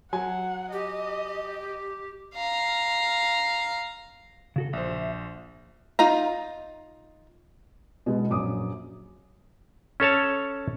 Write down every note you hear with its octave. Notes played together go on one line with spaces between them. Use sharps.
F#3 F#5 G#5
G4 D#5
F5 A#5
C#3 F#4 A4
A#1 C5 E5
D#4 F4 A#5
B2 G#3 B3
A#1 F#2 D6 D#6
C#4 A4 C#5 A5